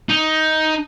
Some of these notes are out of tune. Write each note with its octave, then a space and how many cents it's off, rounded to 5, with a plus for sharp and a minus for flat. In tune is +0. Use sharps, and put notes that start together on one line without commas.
D#4 +10